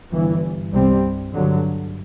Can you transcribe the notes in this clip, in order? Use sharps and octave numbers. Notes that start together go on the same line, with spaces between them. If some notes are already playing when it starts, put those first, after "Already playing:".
G1 G2 E3
C2 C3 G3 C4
G2 D3 F#3